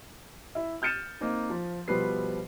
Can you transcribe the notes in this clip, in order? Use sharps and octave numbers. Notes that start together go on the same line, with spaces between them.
E4 E5
F6 G6 A6 C#7 D#7 E7
A#3 C4 D#4
F3
B2 F3 G3 B4 C5 C7